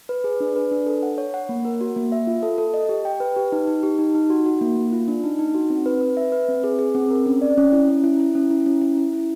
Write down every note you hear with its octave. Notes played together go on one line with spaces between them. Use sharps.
B4
G#4
D4
B4
D4
A4
F#5
C#5
F#5
A#3
A#4
F#4
A#3
E5
F4
A4
A4
D#5
G4
G5
B4
G4
D#4
D#4
G4
D#4
D#4
F#4
F#4
A#3
A#3
F4
D4
D#4
D#4
F#4
C4
B4
B4
E5
B4
C4
G#4
G#4
C4
A#4
C#4
D5
C#4
E4
C#4
E4
E4
C#4
E4
C#4
E4
E4
E4